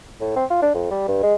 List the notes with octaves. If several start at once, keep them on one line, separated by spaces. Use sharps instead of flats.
A2
C4
F4
D4
F2
G3
G2
G#3